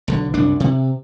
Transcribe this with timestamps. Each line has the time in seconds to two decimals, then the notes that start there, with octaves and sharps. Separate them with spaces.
0.08 B1 D3
0.34 C2 F#2 D4
0.60 C3